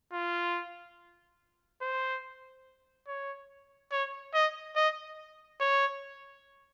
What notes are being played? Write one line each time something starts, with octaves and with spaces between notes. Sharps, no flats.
F4
C5
C#5
C#5
D#5
D#5
C#5